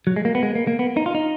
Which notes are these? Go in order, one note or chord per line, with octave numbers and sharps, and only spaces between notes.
F#3
G#3
A#3
B3
G#3
A#3
A#3
B3
D#4
F4
D#4